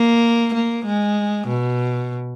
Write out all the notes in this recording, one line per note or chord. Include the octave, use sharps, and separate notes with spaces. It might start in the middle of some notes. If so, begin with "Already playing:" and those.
Already playing: A#3
A#3
G#3
B2